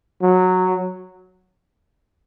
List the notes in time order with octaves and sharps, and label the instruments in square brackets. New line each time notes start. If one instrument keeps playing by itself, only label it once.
[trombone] F#3